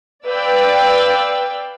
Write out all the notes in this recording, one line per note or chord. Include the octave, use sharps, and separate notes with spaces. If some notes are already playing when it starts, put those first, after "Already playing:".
B4 D5 F5 G5 E6